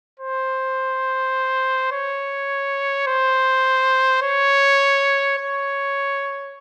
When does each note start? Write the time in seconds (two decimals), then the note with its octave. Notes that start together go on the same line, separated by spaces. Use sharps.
0.20 C5
1.92 C#5
3.07 C5
4.22 C#5
5.38 C#5